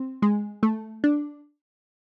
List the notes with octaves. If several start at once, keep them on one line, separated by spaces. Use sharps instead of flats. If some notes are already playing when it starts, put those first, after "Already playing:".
Already playing: C4
G#3
A3
D4